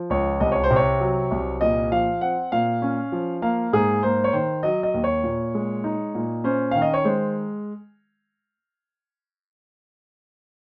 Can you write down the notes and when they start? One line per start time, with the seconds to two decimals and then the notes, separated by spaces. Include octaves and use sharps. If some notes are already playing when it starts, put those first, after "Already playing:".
Already playing: F3
0.10 C#2 C#5
0.40 C2 D#5
0.52 C#5
0.64 C5
0.71 C3
0.76 C#5
1.00 F#3
1.31 C2
1.61 A#2 D#5
1.92 F3 F5
2.21 C4 F#5
2.52 A#2 F5
2.82 C#4
3.12 F3
3.42 A#3 F5
3.73 G#2 G#4
4.03 A#3 C5
4.24 C#5
4.33 D#3 C5
4.63 F#3 D#5
4.83 D#5
4.94 D#2
5.04 C#5
5.24 A#2
5.55 G#3
5.84 D#4
6.15 A#2
6.44 C#4 C5
6.71 D#3 F5
6.82 D#5
6.94 C#5
7.05 G#3 C5